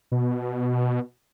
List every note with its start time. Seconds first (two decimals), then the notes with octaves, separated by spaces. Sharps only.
0.12 B2